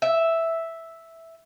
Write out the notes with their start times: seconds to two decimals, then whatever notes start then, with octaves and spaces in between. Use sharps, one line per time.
0.02 E5